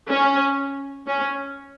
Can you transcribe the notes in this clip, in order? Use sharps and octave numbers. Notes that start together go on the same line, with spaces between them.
C#4
C#4